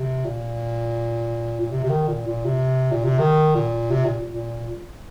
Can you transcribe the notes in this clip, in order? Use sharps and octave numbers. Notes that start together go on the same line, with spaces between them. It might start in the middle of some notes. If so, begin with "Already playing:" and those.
Already playing: C3
A#2
A#2
C3
C3
D#3
A#2
A#2
C3
A#2
C3
D#3
A#2
C3
A#2
A#2